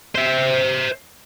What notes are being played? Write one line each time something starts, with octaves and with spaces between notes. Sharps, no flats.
C5 E5